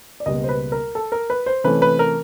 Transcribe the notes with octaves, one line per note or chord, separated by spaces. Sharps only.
D5
C#2 B2 G3 A#3 D#5
C5
B4
A#4
A4
A#4
B4
C5
C3 E3 A3 C#4 B4
B4
A#4